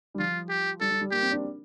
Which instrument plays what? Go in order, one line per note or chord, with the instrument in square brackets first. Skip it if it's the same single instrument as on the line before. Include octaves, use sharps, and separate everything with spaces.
[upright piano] G3
[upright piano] F3 [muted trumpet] F4
[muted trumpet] G4
[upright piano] G3 [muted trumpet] A4
[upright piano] G3
G3
[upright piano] A#3 [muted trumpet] G4
[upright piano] C4
D4